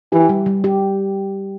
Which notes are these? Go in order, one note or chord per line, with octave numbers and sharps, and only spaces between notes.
E3 G4
G3
G3
G4